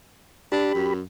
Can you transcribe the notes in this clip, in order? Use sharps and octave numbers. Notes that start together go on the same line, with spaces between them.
D4 G4 B5
F#2